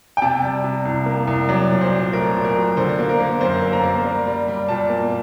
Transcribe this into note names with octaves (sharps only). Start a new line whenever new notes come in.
G5
C3 A5
G3
C3
C2
A#3
C2
F#3 D5
A#2
C5
A#2
A3 A#4
A#2
A#4
F#3
D3 C5
A#3
A#4
A#3
F#2 C5
A#3
A#5
A#3
G3
G3
G3
A#2 A5
A#3